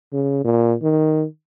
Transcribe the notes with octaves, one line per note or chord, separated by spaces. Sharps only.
C#3
A#2
D#3